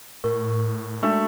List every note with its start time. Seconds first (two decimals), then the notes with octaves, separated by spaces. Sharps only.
0.24 A2 A#4 C#6
1.03 G#3 A3 D4 F#4